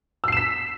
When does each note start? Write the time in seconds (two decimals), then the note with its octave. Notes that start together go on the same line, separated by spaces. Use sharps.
0.24 E6
0.28 C7
0.32 E7
0.37 B6